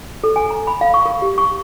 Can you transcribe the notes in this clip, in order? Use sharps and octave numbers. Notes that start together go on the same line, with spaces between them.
A4
G#5
A#5
B5
F5
C#6
A#4
G4
C#6